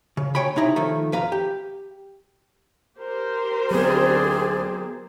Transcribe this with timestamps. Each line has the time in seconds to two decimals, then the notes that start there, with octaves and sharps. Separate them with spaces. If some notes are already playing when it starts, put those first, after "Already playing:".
0.17 C#3
0.35 D2 C#5 G5 G#5 B5
0.56 C3 D#4 E4 A#5
0.76 D#3 F3 A3
1.12 F2 B4 F5 A#5
1.32 G4
2.99 G4 A#4 C5
3.71 D2 F#3 B3 C4 G#4 D5